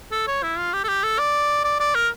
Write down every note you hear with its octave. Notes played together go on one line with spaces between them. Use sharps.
A4
C#5
E4
F4
G4
A4
G4
A4
D5
D5
D5
A#4